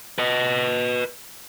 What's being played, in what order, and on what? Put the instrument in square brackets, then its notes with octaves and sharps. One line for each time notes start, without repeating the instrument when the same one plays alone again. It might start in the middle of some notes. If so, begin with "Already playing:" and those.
[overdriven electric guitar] B4 D#5